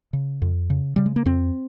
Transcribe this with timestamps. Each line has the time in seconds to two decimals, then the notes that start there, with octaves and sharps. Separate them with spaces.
0.13 C#3
0.42 F2
0.70 C#3
0.96 C#3 G3
1.06 G#3
1.16 A#3
1.26 F2 C4